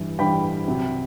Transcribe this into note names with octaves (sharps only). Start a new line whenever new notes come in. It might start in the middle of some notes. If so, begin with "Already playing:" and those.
Already playing: G2 E3 G3
G2 E3 G3 G5 B5
C2 C3 F#3